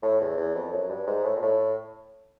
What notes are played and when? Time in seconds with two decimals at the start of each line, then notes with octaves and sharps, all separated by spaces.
0.03 A2
0.21 E2
0.37 E2
0.55 F2
0.72 F#2
0.90 G2
1.07 G#2
1.24 A2
1.36 A#2
1.42 A2